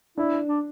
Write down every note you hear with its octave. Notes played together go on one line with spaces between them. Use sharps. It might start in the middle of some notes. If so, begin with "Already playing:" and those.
D4 E4
D4